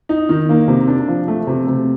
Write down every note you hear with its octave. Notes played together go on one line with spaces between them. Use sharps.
D#4
D#3
A#3
C3
D4
F3
A3
C3
C3